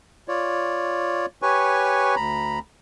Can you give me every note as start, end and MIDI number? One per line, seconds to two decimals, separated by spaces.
0.28 1.26 65
0.28 1.26 73
0.28 1.26 74
1.42 2.15 67
1.42 2.15 71
1.42 2.15 73
1.42 2.15 80
1.42 2.15 85
2.16 2.59 38
2.16 2.59 82
2.16 2.59 83